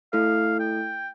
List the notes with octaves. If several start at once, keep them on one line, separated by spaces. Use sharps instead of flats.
A3 E4 A4 F5
G5